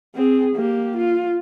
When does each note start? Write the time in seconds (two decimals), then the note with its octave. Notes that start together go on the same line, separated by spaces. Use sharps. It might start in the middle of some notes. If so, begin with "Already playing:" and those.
0.15 C4 G#4
0.56 A#3 G4
0.97 F4